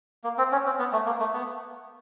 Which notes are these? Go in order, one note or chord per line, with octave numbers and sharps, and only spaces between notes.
A#3
C4
C#4
C4
B3
A3
A#3
A3
B3